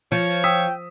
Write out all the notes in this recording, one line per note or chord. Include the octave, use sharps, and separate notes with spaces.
F3 C#5
G5 D#6 E6 B6